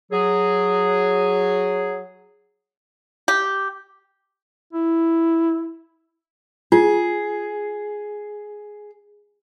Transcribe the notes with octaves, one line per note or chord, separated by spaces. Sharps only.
F#3 G#4
G4
E4
F4 G#4